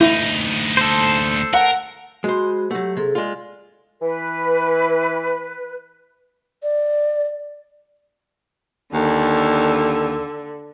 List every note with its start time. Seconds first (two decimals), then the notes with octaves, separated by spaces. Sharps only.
0.01 D2 D#4 E4
0.77 A4 C5
1.54 A#4 F#5
2.24 G#3 F#4 C5 B5
2.71 F#3 A3 G4 F#5
2.97 C3 G#4 A4
3.15 G#3 F4 D5
4.02 E3 B4
6.63 D5
8.94 D#2 D3